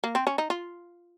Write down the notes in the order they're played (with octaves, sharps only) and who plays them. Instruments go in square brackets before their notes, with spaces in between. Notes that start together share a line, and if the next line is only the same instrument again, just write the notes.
[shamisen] A#3
C4
C#4
D#4
F4